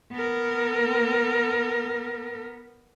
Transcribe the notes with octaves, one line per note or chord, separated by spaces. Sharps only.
B3 A#4